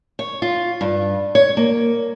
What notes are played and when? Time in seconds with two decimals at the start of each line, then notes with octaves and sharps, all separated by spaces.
0.19 C#5
0.42 F4
0.81 G2
1.35 C#5
1.57 A#3